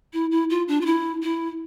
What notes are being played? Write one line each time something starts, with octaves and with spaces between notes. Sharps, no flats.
E4
E4
F4
D4
F4
E4
E4